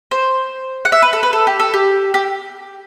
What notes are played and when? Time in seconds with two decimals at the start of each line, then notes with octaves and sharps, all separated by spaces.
0.11 C5
0.85 F#5
0.92 E5
1.02 B4
1.13 A4
1.23 B4
1.33 A4
1.47 G4
1.60 A4
1.74 G4
2.14 G4